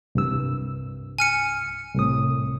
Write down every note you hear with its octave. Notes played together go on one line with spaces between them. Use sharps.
C2 G2 E6
G#5 F6 C#7
C2 A2 D#6